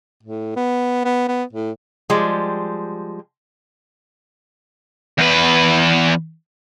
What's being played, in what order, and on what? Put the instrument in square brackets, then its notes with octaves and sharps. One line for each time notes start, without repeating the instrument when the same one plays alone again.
[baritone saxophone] A2
B3
B3
B3
A2
[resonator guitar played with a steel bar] F3 G3 G#3
[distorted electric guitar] E2 B4